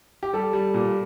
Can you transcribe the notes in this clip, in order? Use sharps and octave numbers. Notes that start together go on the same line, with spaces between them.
G4
G3 A4
G3
A#2